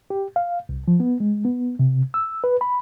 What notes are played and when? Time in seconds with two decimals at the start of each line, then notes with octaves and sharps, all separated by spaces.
0.10 G4
0.36 F5
0.69 C2
0.88 F3
1.00 B3
1.20 G#3
1.45 B3
1.79 C3
2.14 E6
2.44 B4
2.61 B5